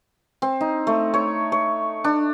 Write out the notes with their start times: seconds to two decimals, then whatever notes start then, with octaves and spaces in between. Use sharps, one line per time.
0.42 C4
0.61 D#4
0.87 A3
1.14 C#5
1.52 C#5
2.04 D4